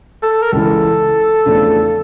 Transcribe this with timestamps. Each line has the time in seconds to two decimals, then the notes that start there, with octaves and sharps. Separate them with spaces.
0.23 A4
0.42 A#4
0.52 C#2 C#3 E3 A4
1.45 E2 C#3 F3 A3 D4